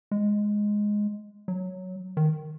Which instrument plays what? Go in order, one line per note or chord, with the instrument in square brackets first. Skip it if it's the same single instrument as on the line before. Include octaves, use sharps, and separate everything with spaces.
[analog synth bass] G#3
F#3
D#3